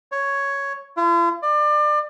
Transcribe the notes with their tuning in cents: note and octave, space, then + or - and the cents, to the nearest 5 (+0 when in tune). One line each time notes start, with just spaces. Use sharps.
C#5 +5
F4 -45
D5 +30